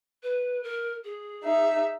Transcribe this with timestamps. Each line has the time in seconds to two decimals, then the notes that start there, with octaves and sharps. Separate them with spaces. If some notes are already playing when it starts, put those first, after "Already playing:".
0.23 B4
0.63 A#4
1.05 G#4
1.43 D#4 E5